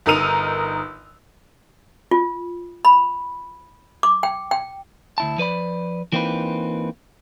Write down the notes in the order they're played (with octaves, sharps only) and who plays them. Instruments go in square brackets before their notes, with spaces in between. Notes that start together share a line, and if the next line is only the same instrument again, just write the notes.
[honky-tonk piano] G1 D#4 A#4 E6 D#7 F7
[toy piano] F4
B5
D6
G5
G5
[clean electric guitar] D2 E4 A5
F3 B4 D5 B5
E3 A#3 C4 D#4 F4 B4